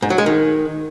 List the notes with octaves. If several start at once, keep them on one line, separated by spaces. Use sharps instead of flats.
G#2
F#3
G#3
D#3